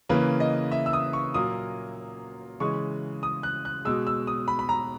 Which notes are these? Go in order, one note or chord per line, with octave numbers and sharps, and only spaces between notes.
C#3 E3 A#3 B4
D#5
E5
E6
D#6
C#6
A#2 F#3 A#3 D#6
C#3 E3 G#3 C#6
D#6
F#6
F#6
B2 G#3 E6
E6
D#6
B5
B5
A#5